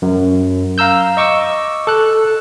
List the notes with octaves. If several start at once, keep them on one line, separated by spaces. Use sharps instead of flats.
F#2
F5 A#5 E6 G6
D#5 C#6 D6 E6
A4 F#6